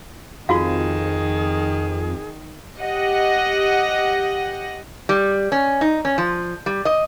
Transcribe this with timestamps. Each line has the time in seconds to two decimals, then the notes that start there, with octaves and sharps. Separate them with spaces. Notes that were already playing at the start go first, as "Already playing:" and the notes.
0.49 F2 D#3 F4 F#4 G#4 F5
2.80 G4 D#5 F#5
5.09 G3
5.52 C#4
5.81 D#4
6.05 C#4
6.18 F3
6.66 G3
6.85 D#5